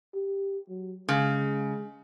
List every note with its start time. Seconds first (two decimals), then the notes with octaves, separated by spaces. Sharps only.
0.14 G4
0.69 F#3
1.08 C#3 G#3